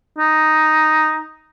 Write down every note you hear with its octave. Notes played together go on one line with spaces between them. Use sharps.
D#4